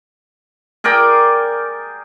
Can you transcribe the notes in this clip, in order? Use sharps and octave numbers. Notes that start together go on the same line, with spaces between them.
G#4 A#4 D5 G5